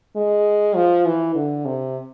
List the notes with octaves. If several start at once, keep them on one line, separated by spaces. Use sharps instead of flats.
G#3
F3
E3
D3
C3